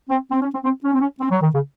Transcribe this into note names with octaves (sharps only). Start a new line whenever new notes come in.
C4
C4
C#4
C4
C4
C#4
C4
C#4
C4
F#3
D#3
C#3